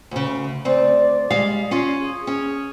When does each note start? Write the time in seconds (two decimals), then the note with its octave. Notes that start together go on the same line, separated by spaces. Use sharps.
0.11 D2 C#3
0.65 D2 C4 D5
1.30 G3 G#3 F5
1.71 C#4 F4
2.01 G#4
2.27 C#4